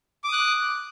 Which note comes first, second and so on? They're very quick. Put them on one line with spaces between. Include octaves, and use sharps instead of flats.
D6 D#6 F#6